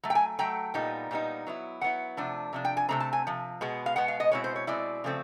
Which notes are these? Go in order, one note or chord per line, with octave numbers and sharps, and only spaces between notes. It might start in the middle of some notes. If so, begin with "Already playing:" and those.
F#3 A3
G5
G#5
F#3 A3 G5
A#2 G3 B3 D#4
A#2 G3 B3 D#4
F#3 B3 E4
F#3 B3 E4 F#5
C3 F3 A3 D4
C3 F3 D4
G5
G#5
C3 F3 A3 C4 A#5
A5
G#5
C3 F3
B2 G#3 B3
F5
B2 G#3 B3 F#5
F5
D#5
B2 G#3 C4 E4 C#5
C5
C#5
B2 G#3 C4 E4 D5
C#3 F3 A3 C4